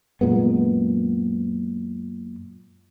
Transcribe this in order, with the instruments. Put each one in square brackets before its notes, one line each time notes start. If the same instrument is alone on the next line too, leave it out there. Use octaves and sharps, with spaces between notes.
[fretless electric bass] F#2 A#2 G#3 B3